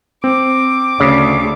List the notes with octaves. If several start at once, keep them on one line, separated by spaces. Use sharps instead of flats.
C4 D6
D2 C#3